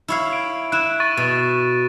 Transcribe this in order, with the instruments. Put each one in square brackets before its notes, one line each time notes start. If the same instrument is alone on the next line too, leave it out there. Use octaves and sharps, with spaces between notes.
[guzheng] E4 C#5 F5
[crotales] D7
[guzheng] E4 [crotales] F#6 E7
[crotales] C#6 A6 D#7
[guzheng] B2